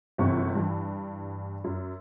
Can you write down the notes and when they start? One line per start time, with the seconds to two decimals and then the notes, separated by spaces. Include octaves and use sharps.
0.18 G1 F#2 C3 E3 C#6
0.55 G2 E3
1.64 F#2